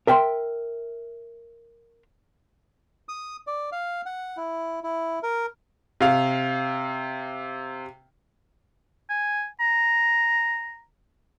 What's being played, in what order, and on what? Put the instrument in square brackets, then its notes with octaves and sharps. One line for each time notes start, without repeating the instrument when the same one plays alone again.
[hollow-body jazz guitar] A#4 E5 G5 A5 C6
[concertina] D#6
D5
F5
F#5
E4
E4
A#4
[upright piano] C3 F5
[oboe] G#5
A#5